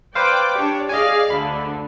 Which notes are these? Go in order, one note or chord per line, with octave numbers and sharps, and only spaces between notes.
B4 C5 D5 F5 G5 D6
D4 G4 C#5
G#4 D5 D#5 F5 G#5
D2 D3 B5